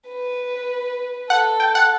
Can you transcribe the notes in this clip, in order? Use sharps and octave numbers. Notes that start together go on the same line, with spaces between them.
B4
A4 F#5
G5
F#5